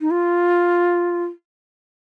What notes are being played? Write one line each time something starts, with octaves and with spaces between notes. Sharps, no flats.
D#4
F4